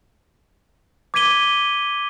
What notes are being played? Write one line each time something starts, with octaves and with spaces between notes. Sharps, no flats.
D6 G#6 B6 D#7 G7